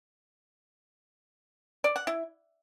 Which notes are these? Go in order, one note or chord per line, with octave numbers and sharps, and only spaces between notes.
D5
F#5
E4